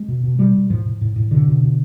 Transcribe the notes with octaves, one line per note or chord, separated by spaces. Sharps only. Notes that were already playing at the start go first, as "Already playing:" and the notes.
Already playing: G#3
B2
B2
B2 G3
B2
A2 F3
A2
A2
A2
B2 D3
B2
B2